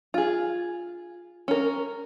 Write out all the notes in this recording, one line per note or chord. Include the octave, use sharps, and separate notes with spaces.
F4 G#4
C#4 A#4